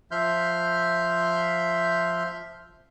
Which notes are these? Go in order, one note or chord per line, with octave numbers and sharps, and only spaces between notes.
F3 E5 C6 F6 G6